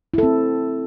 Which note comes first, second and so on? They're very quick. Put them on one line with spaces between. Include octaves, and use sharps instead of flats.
E4 A4 C4